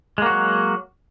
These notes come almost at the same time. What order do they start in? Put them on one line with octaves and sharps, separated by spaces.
G#3 A#3 F#4 F#3